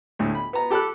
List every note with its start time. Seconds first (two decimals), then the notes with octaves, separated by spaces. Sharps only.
0.19 D2 A2
0.35 B5
0.53 B3 A#5
0.70 G4 A4 B5 D6 F#6